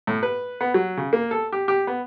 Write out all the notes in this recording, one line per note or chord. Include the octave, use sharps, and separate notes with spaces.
A2
B4
B3
F#3
C#3
A#3
A4
G4
G4
B3